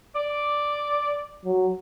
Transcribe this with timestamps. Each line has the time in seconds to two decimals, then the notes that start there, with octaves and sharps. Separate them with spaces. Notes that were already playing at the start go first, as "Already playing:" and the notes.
0.15 D5 D6
1.45 F#3